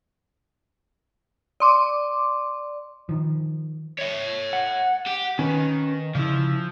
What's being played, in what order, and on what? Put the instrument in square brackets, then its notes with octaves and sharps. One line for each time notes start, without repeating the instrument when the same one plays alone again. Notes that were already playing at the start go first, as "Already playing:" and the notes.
[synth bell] D5 C6 D6
[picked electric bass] D#3 F3
[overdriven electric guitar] C#5 E5
[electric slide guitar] F#5
[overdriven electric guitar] G4
[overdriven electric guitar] D#3 [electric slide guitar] C#4 B4
[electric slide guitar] C#3 E4 [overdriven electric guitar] F3